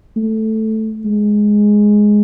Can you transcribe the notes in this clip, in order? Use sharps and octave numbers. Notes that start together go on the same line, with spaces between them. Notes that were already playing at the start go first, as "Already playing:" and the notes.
A3
G#3